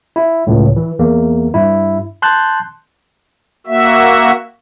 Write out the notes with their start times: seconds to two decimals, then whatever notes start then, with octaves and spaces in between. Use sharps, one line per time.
0.16 E4
0.47 C#2 A2
0.76 E3
0.99 E2 A#3
1.54 G2 E4
2.22 A5 C6 F#6 G6
3.67 A#3 F#4 E5